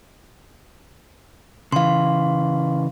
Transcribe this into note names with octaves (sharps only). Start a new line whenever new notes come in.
C#3 E3 F5 C6